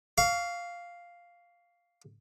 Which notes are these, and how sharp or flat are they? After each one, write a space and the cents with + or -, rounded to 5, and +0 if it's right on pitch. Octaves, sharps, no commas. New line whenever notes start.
F5 +0 C#6 +40